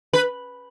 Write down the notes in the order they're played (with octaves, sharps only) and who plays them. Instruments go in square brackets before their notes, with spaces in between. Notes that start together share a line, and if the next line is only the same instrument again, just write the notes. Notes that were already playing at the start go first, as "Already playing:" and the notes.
[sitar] B4